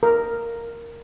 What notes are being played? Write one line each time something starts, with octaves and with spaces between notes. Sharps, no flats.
A#4